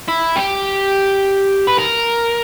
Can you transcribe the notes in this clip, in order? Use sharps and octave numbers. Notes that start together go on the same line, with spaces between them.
E4
G4
B4
A#4